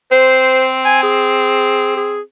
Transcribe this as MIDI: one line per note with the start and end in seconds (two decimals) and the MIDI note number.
0.12 2.23 60
0.12 0.67 72
0.85 0.99 80
1.03 1.93 68
1.97 2.21 68